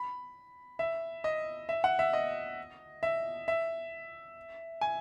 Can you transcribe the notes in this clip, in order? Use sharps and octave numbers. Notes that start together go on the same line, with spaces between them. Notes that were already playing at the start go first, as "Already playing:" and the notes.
Already playing: B5
E5
D#5
E5
F#5
E5
D#5
E5
E5
G#5